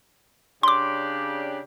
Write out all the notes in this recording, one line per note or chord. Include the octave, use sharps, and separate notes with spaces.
C#3 D4 G4 C6 D6